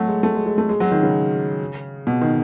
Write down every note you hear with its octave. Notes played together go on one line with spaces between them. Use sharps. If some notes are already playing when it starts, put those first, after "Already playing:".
Already playing: F#3 A3
G#3
A3
G#3
G#3
A3
G#3
F#3
D#3
C#3
B2
D#3